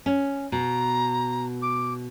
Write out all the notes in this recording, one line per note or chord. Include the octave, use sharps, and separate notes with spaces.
C#4
B2 A#5
D6